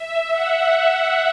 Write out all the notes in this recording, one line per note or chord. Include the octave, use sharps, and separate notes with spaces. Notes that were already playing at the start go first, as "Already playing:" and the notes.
Already playing: E5
F#5